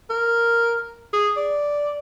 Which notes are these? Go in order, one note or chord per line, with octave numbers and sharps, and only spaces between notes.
A#4
G#4
D5